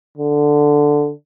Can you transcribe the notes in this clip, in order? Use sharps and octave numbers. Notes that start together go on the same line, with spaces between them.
D3